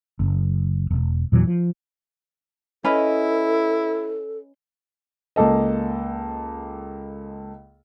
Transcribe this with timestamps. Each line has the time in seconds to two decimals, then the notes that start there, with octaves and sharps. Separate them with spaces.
0.19 F#1
0.90 E1
1.32 E2 A#2 E3 F#3
1.47 F3
2.84 C#4 E4 A4 B4 D#5
5.36 C#2 A#3 A4 D#5